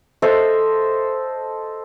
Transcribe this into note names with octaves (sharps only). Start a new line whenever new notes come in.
A4 C5 D#5 E5